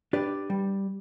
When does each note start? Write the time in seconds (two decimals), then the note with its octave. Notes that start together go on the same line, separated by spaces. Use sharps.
0.13 D4 G4 B4 D5
0.50 G3